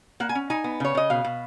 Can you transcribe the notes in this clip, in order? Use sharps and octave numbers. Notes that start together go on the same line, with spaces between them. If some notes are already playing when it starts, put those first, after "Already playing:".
A#3 F#5
G#5
C#4
D#4 G#5
B3
C#3 C#5
C#3 D#5
B2 F5
B2